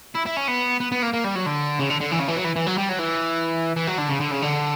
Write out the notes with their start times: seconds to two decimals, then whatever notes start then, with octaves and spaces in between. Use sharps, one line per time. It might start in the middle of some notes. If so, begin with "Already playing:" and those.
0.15 E4
0.26 E4
0.37 C#4
0.48 B3
0.80 B3
0.92 B3
1.03 A#3
1.14 A#3
1.24 G3
1.36 F#3
1.46 D3
1.79 C#3
1.90 D3
2.01 D3
2.12 E3
2.20 C#3
2.28 E3
2.37 F#3
2.45 E3
2.56 E3
2.67 F#3
2.78 G3
2.89 F#3
2.99 E3
3.76 E3
3.87 F#3
3.98 D3
4.09 C#3
4.20 D3
4.31 C#3
4.42 D3